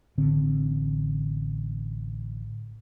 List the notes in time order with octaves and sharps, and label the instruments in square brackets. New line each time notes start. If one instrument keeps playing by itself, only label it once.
[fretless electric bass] A1 D3 C4